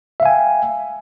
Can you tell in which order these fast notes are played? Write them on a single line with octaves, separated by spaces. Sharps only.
E5 F5 G#5 G5